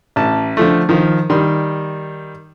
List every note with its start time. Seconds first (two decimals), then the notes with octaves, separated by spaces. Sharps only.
0.16 A1 A5
0.57 D3 F3 A3
0.89 D#3 F3
1.30 D#3 G3 C6